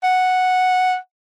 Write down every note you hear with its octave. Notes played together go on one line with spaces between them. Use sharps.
F#5